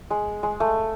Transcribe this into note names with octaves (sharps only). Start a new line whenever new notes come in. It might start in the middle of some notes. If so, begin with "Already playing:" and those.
G#3
G#3
A3